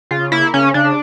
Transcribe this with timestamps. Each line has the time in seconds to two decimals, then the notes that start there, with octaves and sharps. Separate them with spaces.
0.11 C#3 F4
0.32 A#3 E4
0.54 C#3 C#4
0.74 C#3 D4